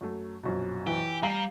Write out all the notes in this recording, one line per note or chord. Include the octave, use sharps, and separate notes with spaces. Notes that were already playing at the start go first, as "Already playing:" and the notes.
F#2 F#3 A3
A#1 F#2 B2
E3 G4
G3 G4 F5 A#5 C7